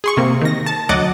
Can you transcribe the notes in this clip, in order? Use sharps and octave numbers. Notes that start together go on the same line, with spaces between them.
G#4 C6 C#6
C3 A#3
D#3 A#6
A5
D2 F#3 D#5 F#5 D6 A6